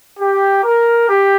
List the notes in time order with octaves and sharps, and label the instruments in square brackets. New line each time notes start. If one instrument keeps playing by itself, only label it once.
[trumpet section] G4
A#4
G4